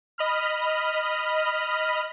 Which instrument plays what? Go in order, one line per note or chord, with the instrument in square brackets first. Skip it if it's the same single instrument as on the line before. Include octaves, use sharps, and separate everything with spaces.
[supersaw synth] D#5 B5 F6